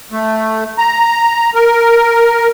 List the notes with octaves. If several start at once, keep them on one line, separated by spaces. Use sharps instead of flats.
A3
A#5
A#4